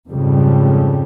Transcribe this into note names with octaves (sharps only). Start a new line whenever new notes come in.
F2 G#2 C#3 G3